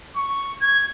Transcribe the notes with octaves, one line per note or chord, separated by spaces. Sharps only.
C#6
G#6